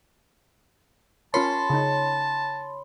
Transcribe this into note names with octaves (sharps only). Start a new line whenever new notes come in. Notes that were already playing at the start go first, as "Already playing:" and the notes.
C#4 F4 A#4 C#5 A5 B5 C6
C#3 D#4